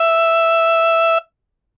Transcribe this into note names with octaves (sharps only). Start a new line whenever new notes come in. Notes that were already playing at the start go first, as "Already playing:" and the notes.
Already playing: E5